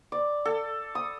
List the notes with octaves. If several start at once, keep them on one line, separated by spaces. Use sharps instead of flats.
D5
A4
D#6